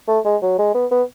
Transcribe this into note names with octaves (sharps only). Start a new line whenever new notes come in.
A3
G#3
F#3
G#3
B3
B3